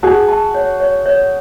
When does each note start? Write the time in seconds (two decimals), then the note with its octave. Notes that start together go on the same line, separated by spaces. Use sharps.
0.03 F#4 G#4 A5
0.28 A5
0.55 C#5
0.80 C#5
1.06 C#5